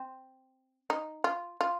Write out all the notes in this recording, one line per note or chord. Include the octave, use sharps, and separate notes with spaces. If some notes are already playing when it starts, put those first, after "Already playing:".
Already playing: C4
D#4
F4
F4